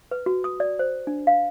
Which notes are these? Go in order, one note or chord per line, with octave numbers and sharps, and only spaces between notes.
B4
F#4
D#6
D5
C5
D4
F5